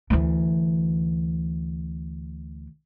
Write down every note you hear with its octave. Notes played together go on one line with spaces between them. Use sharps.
D2 E3